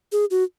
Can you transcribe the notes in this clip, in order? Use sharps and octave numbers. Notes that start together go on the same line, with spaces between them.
G#4
F#4